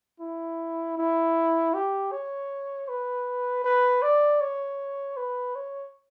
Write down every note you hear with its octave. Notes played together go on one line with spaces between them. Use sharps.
E4
E4
G4
C#5
B4
B4
D5
C#5
B4
C#5